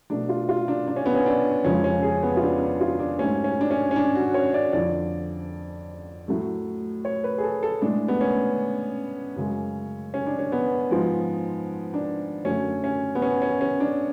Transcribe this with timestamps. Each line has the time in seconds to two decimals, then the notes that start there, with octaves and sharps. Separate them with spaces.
0.10 B2 A3 D4
0.29 F4
0.49 F4
0.68 D4
0.88 D4
0.96 C#4
1.06 B3
1.15 C#4
1.26 D4
1.64 F2 C#3 F3 G#3 C#4
1.84 C#4
2.03 G#4
2.23 B3
2.37 F4
2.42 D4
2.60 D4
2.81 F4
2.99 D4
3.19 G#2 F#3 A3 C#4
3.44 C#4
3.61 D4
3.71 C#4
3.91 C#4
3.96 D4
4.15 F#4
4.34 C#5
4.54 D5
4.73 F2 D3 F3 D5
6.28 A2 F#3 A3
7.05 C#5
7.24 B4
7.38 G#4
7.43 A4
7.63 A4
7.82 A2 G#3 D4
8.08 B3
8.21 C#4
9.36 F#2 C#3 G#3
10.14 C#4
10.27 D4
10.39 C#4
10.52 B3
10.91 G#2 F3 G#3
11.94 D4
12.45 F#2 D3 F#3 A3 C#4
12.84 C#4
13.15 B3
13.22 C#4
13.42 C#4
13.61 C#4
13.80 D4